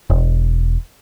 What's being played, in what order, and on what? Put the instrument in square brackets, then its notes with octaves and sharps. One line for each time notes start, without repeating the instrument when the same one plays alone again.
[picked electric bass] E1